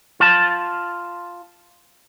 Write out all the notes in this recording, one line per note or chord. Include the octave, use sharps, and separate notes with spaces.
F4 A5